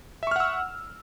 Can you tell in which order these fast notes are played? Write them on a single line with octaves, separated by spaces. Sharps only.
E5 C#6 F6 F#5 E6